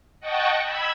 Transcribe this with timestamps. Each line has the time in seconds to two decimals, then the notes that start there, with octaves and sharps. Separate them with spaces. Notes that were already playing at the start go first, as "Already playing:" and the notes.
0.20 D#5 F#5 G5 A5 C#6
0.63 B5 E6 G#6